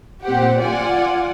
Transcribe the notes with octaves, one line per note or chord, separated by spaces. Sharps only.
A#2 C4 G4 F#5
F4 D5 F#5 G#5